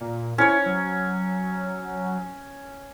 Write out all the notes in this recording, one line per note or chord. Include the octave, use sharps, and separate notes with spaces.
A#2
C#4 E4 C#5
F#3